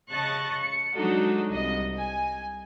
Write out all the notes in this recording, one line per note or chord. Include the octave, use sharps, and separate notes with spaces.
C#3 D#5 A5 C#6 F#6 A6
C#7
F#3 G#3 D4 D#4 F#4 A4
C2 D#5
G#5